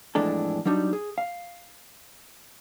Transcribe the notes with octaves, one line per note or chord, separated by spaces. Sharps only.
F2 A2 E3 G#3 D4 A4
F#3 G3 D4 D#4
G#4
F5